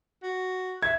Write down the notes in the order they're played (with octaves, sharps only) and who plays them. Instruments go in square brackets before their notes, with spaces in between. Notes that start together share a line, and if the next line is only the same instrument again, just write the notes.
[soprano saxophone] F#4
[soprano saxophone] E5 [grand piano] G#6